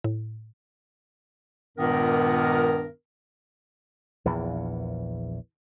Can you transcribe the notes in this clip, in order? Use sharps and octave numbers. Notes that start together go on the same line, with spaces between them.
A2
C#2 G2 A#2 D#3 B3 A#4
A#1 E2 E3